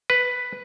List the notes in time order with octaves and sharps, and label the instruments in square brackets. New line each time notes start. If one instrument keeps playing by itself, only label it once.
[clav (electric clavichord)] B4